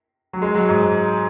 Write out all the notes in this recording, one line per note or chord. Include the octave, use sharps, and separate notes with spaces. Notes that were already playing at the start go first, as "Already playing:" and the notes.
F#3
G#3
F#3
G#2